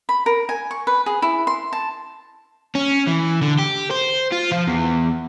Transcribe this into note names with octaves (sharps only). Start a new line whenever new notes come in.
B5
A#4
G#5
C#6
B4
G#4
E4
C6
A5
C#4
E3
D3
G4
C5
F4
F3
E2